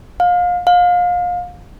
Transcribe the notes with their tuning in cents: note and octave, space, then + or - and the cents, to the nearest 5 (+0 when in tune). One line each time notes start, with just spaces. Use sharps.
F5 +30
F5 +30